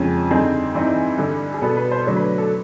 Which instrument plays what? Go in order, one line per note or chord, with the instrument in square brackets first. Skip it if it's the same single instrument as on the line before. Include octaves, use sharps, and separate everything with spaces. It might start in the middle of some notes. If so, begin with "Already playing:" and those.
Already playing: [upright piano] F2 C#3 F3 G#3 C#4
G2 D3 G3 C4 D#4 G#4
G2 E3 G3 C4 D#4
G2 D3 G3
G#4
B2 G3 B3 A4
B4
C5
D3 F#3 A3 D4 C#5
B4
A4